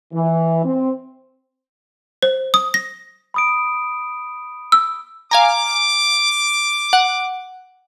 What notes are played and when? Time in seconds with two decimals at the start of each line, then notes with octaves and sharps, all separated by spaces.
0.14 E3
0.65 C4
2.23 C5
2.54 D#6
2.74 A#6
3.34 B5 D#6 D7
4.72 E6
5.31 F5 G#5 A#5 D6
6.93 F#5